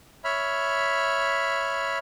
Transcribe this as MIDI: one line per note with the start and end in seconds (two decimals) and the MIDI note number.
0.24 1.98 73
0.24 1.98 76
0.24 1.98 83
0.24 1.98 89